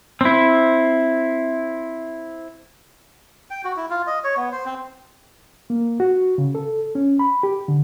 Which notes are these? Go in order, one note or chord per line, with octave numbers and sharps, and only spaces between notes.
C4 E4
G5
F#4
E4
F4
D#5
C#5
B3
C5
C4
A#3
F#4
C#3
A4
C#4
B5
G4
D3